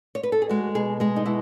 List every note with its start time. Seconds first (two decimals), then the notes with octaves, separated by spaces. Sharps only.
0.15 C#5
0.23 B4
0.32 A4
0.42 G#4
0.49 G#3 F#4
0.75 B2 G#4
1.00 G#3 G#4
1.16 D#4
1.26 B2 E4